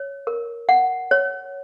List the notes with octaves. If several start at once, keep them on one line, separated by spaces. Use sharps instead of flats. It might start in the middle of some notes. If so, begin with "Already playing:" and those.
Already playing: C#5
A#4
F#5
C#5